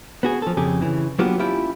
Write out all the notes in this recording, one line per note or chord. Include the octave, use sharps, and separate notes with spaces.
B3 F#4 G#4
F3 A4
F2 C#3 G4 G#4
C#3 E3
F#3 A#3 B3 D4 F4 G4
C#4 E4 F4 G4 G5